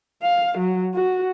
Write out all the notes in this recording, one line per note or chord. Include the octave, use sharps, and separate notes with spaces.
F5
F#3
F#4